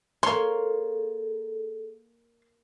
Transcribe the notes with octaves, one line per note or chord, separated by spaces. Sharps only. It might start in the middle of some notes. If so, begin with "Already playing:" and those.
A#3 G#4 A4 C#5 C6